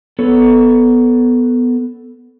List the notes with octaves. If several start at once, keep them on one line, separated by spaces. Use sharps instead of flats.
B3 A4 C#5